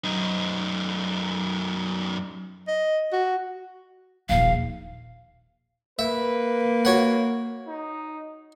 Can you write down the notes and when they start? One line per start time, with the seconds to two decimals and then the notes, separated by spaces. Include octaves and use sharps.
0.05 F#2 D#4
2.68 D#5
3.12 F#4
4.29 D#1 A#1 F5
5.99 A#3 B4 E5
6.85 F#4 C#5 F#5
7.68 D#4